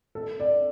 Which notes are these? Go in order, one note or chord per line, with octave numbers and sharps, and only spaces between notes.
A4
D5